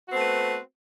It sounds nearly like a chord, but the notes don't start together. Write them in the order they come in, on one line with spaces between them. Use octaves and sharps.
F#4 C4 B3 A3 B4